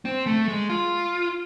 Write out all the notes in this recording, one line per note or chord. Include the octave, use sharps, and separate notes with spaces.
C4
A3
G#3
F4